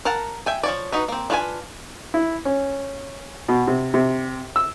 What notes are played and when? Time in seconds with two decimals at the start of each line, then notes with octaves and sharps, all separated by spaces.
0.05 A#4 F5 F#5 A5
0.46 E5 G5 G#5
0.63 F3 C#5 D5
0.92 D#4 F#4 B4
1.08 A#3 C4
1.30 D4 F4 B4 C#5 G#5
2.14 E4
2.45 C#4
3.48 B2
3.67 C3
3.94 C3
4.56 E6